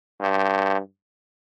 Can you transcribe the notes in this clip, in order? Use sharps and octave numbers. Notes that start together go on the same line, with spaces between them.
G2